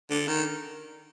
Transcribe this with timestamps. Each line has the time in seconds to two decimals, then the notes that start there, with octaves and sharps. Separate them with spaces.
0.10 D3
0.28 D#3